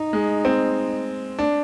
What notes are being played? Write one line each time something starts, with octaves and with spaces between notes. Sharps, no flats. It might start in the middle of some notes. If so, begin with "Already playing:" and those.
Already playing: D#4
G#3
C4
D4